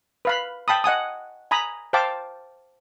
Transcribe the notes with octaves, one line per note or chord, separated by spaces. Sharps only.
B4 F5 B5
G5 A5 B5 D#6
D#5 F#5 G#5 D#6
G#5 A#5 B5 D#6
C5 F5 G5 A5 D6